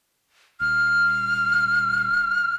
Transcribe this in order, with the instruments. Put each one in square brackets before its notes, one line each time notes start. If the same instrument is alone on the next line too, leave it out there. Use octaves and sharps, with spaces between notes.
[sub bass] D#1 [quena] F6